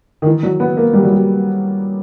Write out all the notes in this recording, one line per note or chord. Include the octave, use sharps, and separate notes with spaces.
D#3
E3
F#3
B3
A#3
G3
F#3
G3